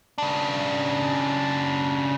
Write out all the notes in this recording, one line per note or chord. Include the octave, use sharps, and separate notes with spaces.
C#3 D4